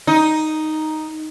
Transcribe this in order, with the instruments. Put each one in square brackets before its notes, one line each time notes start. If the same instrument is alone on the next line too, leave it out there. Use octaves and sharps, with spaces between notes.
[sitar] D#4